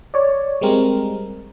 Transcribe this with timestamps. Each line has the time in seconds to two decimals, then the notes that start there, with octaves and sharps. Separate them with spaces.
0.14 C#5 D5
0.61 G3 G#3 C4 A#4